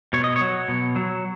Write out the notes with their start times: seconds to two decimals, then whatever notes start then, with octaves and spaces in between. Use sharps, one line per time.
0.13 B2 C#5
0.24 D#5
0.36 C#5
0.41 F#3
0.68 B2
0.96 F#3